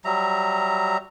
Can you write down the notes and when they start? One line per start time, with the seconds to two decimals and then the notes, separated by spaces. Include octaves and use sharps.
0.05 F#3 G3 E5 A#5